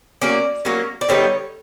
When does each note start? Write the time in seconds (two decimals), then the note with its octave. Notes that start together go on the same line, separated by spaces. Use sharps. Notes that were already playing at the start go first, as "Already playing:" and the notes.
0.22 F#3 A#3 C#4 D5
0.65 F#3 A#3 C#4
1.01 D5
1.09 D3 G3 B3 D#4 C#5